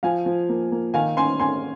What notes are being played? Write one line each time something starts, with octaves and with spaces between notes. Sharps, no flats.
F3 F5 G#5
F3
A#3
A#3
D#3 F5 G#5
C#4 G#5 C6
C#4 G#5 C6